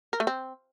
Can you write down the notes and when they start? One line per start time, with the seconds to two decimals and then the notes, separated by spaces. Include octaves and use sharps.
0.13 A#4
0.20 A3
0.27 C4